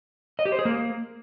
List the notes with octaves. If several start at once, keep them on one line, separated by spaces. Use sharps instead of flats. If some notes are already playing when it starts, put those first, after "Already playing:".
D#5
G4
C5
G#4
A#3